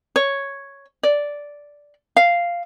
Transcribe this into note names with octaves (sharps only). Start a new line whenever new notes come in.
C#5
D5
F5